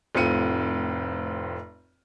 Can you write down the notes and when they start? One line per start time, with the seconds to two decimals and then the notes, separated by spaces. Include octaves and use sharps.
0.15 F1 A2 C4 F4 C#7 D#7